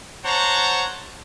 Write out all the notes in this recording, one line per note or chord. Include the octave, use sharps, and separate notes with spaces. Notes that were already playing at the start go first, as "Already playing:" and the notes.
C5 C#5 F#5 A5 A#5